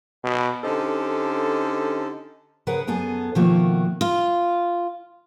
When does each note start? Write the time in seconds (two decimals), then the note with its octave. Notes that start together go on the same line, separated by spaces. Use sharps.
0.24 B2
0.63 D3 C#4 D#4 G4 A4 C5
2.67 C#3 G#4 A#4 B4 F#5
2.87 F#2 B3 G#4 A4
3.35 B2 D#3 F3 A3 A#3 F#4
4.01 F4